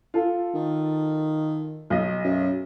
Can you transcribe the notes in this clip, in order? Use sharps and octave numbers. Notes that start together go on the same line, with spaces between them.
F4 A4
D#3
B1 D#5
F#2